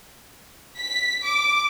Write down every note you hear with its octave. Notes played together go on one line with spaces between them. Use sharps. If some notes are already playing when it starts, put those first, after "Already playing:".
B6
D6